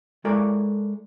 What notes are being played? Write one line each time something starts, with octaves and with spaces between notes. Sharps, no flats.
G#3 E4 A4 A#4 C#5 D5